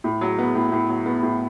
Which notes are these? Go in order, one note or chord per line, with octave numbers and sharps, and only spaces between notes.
A2
F#3
B3
A2
A2
F#3
B3
A2